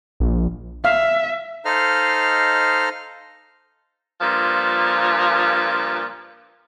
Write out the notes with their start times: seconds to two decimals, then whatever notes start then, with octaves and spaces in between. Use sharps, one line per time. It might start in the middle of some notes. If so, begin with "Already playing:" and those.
0.20 A#1
0.85 E5 F5
1.65 D#4 A4 C5 D#5 F5 F6
4.21 G2 A#2 F3